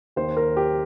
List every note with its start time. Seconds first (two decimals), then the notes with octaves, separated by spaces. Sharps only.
0.16 D#2 D#3 C5
0.37 A#4
0.57 G4